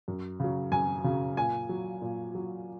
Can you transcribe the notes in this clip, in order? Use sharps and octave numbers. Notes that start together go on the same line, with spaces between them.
F#2
C#3 F#3
F#2 G#5
C#3 F#3
A#2 G#5
F#3
A#2
F#3